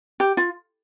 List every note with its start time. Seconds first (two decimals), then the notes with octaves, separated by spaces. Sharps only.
0.20 G4
0.37 F4